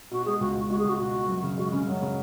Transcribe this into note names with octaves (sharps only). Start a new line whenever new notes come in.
B2 F#4
G#3 G#4
C#2 F#4
C#2
G#3 F#4
G#4
C#2 F#4
B2 F#4
B2
F#2
C#3
G#3 F#4
C#3 C#4
F#2 F#3
C#3